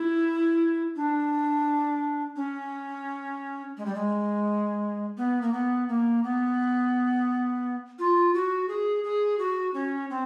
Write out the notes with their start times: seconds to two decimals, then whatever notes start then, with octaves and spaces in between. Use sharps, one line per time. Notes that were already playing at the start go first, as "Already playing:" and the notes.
Already playing: E4
0.96 D4
2.36 C#4
3.77 G#3
3.85 G3
3.95 G#3
5.17 B3
5.42 A#3
5.53 B3
5.89 A#3
6.24 B3
7.99 F4
8.34 F#4
8.68 G#4
9.04 G#4
9.39 F#4
9.74 C#4
10.10 C4